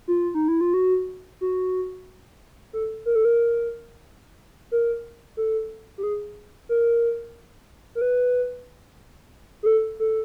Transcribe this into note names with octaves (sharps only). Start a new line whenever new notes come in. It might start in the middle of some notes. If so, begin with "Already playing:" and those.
F4
D#4
E4
F4
F#4
F#4
A4
A#4
A4
A#4
A#4
A4
G4
G#4
A#4
A#4
B4
G#4
A4
A4